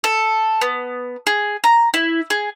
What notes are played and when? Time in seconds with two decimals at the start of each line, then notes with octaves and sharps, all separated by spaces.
0.04 A4
0.61 B3
1.27 G#4
1.64 A#5
1.94 E4
2.30 G#4